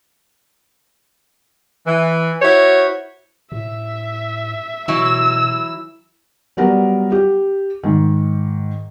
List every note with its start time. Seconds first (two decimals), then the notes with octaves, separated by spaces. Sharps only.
1.85 E3
2.40 E4 F#4 C5 C#5
3.52 A2 E5
4.88 B2 E3 F#3 E4 E6
6.57 F#3 G3 B3 A#4
7.12 G4
7.83 G#2 D#3